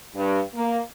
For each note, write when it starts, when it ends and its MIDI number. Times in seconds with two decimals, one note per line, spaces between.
0.15 0.40 43
0.55 0.80 58